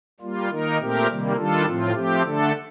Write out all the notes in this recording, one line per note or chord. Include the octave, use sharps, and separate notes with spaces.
G3 A#3 F4
D#3 A#3 D#4 A#4
A#2 A3 C4 G4 A#4
C3 D#3 G3 A#3
D#3 G3 D4 F4 A4
A2 F3 C4 F4
F3 A3 C4 G4
D3 A3 D4 A4